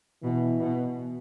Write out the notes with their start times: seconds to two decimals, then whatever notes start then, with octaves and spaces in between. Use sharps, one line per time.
0.23 B2 E3
0.59 B2